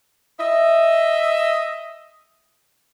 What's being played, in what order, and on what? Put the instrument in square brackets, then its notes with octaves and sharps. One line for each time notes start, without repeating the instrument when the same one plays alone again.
[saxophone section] D#5 E5